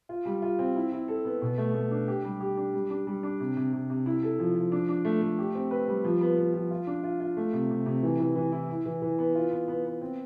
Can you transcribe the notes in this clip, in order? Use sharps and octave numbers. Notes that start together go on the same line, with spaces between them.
F4
G3
F4
C4
E4
E4
A4
B3
B2
A3
A3
D4
G4
G3
G4
D4
G3
D4
G3
D4
C3
C3
C3
C3
E4
A4
F3
F3
D4
D4
A3
A3
G4
C4
B4
G3
F3
B3
B3
F3
F4
D4
F4
F4
A3
C3
C3
C3
E3
E3
E3
E4
E4
E3
E3
B3
F4
B3
B3
B3
C4